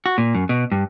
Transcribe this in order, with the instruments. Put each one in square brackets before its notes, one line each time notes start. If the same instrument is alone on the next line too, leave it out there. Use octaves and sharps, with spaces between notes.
[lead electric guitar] F#4
A#2
F#2
B2
G2